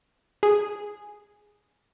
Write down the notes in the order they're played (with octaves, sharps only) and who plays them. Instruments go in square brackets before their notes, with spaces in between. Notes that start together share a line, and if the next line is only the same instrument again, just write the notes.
[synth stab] G#4